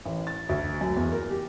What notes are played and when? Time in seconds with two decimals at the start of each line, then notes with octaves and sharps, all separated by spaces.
0.05 A1
0.27 A6
0.49 D2
0.81 F#2
0.97 E2
1.12 A#4
1.30 G4